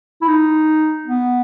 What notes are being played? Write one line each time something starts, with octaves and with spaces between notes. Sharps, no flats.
E4
D#4
B3